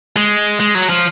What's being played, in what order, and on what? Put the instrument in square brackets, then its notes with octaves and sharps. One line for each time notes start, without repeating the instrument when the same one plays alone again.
[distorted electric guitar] G#3
G#3
F#3
F3